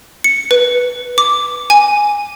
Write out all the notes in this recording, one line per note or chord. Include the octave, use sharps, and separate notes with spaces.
C#7
B4
D6
G#5